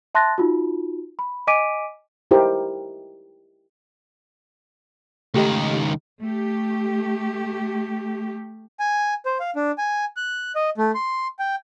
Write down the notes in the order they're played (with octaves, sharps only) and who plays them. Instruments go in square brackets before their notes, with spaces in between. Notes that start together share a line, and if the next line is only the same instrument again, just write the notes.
[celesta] E5 A5 C6 F#6 A6 A#6
D#4 F4 F#4
B5
D#5 G#5 D6 B6 D7 D#7
[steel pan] D#4 E4 G4 A#4 C5
[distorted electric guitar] C#2 D#3 [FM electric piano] A3 G4 D#5
[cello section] A3 G4
[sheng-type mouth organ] G#5
C5
F5
D4
G#5
F#6
D#5
A3
C6
G5